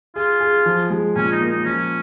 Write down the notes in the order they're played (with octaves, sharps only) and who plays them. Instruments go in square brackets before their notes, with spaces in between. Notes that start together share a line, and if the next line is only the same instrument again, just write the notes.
[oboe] F4 [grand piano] G#4
[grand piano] G#4
F3
G#3
[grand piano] A#2 [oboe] C#4
[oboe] D#4
[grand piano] A#3
[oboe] D#4
[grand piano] F3 [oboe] C#4